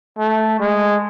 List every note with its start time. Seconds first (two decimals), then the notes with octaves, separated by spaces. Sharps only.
0.18 A3
0.60 G#3